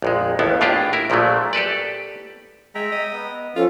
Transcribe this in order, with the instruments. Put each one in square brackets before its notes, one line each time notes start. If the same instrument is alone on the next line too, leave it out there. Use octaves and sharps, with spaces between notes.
[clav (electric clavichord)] A#1 F2 G#3
A1 D#2 B3 E4
A2 D4 F4 G4 G#4 G5
E4 A#4
A#1 A#2 F3 F#3 A3
G4 A4 B4 D5
[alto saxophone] G#3 [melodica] E5 G5 A#5
[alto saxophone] D#5
[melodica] B3
[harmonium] F3 C#4 [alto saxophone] F4 [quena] A4